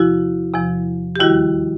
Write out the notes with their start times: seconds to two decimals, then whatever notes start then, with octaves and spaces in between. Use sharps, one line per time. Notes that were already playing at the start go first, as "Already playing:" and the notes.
Already playing: E2 C3 F3 E4 F#4
0.54 E2 C3 F3
1.16 G4
1.19 D#2 D#3 G3 E4 F#4